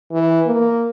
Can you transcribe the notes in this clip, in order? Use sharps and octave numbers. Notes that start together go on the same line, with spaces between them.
E3
A#3